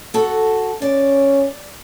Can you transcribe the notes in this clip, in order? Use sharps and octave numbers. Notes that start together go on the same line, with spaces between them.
F#4 A4
C#4 D5